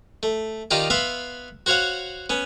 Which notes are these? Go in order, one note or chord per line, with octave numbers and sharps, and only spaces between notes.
A3
D#3 D#4 F4 G4 D5
B3 E5 F5 B5 C6
F#4 C5 C#5 F5 F#5
B3 C#4